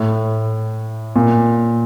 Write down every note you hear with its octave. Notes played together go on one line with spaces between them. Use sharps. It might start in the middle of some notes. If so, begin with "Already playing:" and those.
Already playing: A2
A#2